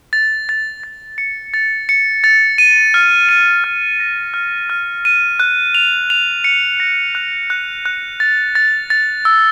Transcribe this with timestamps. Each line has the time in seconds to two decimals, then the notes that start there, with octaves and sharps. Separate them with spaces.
0.13 A6
0.49 A6
0.83 A6
1.18 C#7
1.54 A6
1.89 C#7
2.24 A6
2.58 D#7
2.94 F6
3.29 D#7
3.64 F6
4.00 A#6
4.34 F6
4.70 F6
5.05 D#7
5.40 F#6
5.75 F7
6.10 F7
6.44 C#7
6.80 A#6
7.15 F#6
7.50 F#6
7.86 F#6
8.20 A6
8.55 A6
8.90 A6
9.25 E6